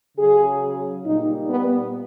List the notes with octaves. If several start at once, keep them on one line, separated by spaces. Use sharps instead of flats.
C#3 F#3 G#4
A#2 G3 D#4
B3